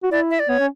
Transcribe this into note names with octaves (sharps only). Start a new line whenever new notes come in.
F#4
E4 D5
E5
D5
B3 C#5
C#4